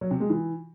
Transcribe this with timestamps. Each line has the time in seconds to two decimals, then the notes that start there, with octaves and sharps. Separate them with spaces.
0.01 F#3
0.11 C3
0.20 G#3
0.30 E3